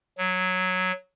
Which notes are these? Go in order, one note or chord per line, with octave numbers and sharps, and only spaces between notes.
F#3